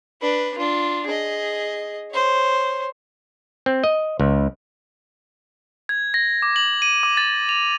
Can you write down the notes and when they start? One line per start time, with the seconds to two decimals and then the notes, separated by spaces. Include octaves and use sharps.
0.22 D4 B4
0.58 D4 F4
1.07 G#4 D#5
2.11 C5 C#5
3.66 C4
3.84 D#5
4.20 C#2
5.89 G#6
6.14 A#6
6.42 D6
6.56 F#7
6.82 D#7
7.03 D6
7.17 A6
7.49 F7